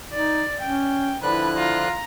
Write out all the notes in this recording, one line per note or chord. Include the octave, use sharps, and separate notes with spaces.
D#4 D5
C#4 G5
D3 F3 D4 E4 B4 F#6
F4 A#5